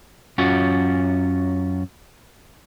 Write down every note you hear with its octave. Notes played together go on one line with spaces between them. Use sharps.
F#2 C#4 F4 F#4